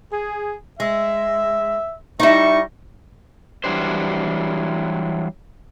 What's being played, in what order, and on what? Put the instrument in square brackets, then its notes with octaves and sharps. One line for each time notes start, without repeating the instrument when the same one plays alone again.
[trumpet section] G#4
[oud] G#3 [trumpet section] E5
[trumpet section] G3 C#6 [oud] D#4 E4
[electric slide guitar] E3 F#3 G3 D4 C5